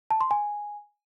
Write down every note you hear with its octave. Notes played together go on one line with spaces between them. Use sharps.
A5
C6
G#5